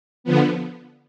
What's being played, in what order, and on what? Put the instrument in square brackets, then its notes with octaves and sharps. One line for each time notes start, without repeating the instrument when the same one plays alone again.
[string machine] D3 F3 B3